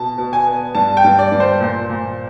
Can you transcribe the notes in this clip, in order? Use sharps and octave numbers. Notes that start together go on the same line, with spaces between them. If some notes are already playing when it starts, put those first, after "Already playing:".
Already playing: B2 A5
B2
G#5
B3
G2 A5
G5
G2
D5
G2
C5
A#2
A#2